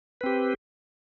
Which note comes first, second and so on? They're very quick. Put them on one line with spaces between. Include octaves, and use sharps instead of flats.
B4 C4 G4